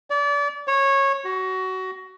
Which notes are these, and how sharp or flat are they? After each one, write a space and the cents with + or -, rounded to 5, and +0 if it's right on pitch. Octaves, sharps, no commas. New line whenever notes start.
D5 -30
C#5 -15
F#4 +20